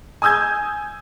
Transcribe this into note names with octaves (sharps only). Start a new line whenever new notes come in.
G#5 D#6 E6 G6 G#6